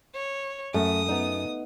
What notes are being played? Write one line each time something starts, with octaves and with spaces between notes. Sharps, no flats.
C#5
F#2 A3 D#6
B3 D#4